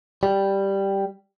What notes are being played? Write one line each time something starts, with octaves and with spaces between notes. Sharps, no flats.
G3